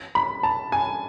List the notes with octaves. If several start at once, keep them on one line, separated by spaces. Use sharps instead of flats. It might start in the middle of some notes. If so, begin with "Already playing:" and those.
B5
A5
G#5